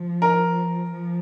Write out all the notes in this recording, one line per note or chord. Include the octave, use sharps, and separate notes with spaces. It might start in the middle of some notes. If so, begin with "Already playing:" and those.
Already playing: F3
A#4
F3